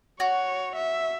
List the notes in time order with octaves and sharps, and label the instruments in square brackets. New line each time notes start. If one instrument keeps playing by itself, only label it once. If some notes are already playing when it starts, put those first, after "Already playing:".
[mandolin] F#4 [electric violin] C#5
[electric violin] E5